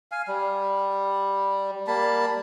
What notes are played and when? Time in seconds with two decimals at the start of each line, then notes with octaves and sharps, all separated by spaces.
0.12 F5 G#5
0.28 G3
1.87 G3 A#3 A5 B5